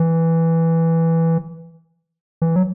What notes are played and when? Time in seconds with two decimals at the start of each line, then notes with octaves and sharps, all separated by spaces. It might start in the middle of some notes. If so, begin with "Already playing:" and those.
Already playing: E3
2.42 E3
2.56 F#3